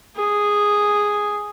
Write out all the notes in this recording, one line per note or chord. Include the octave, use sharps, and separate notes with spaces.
G#4